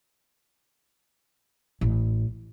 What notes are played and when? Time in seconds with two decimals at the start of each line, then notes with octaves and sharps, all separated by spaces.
1.81 A1